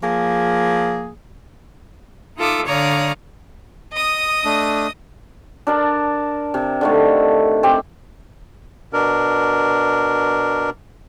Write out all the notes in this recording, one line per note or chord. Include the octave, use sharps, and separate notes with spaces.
F3 A#3 G#4
D#4 F4 A4 E5 D6 D#6
D3 C#5 D5 F5 A#5 D#6
D#5 D#6
A3 D4
D4 A#4 A5
C3
D3 D#3 A3
C4 G4
B2 D4 A#4